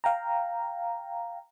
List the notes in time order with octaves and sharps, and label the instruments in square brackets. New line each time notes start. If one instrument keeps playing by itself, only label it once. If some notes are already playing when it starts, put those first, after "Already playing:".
[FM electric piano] F5 G5 A#5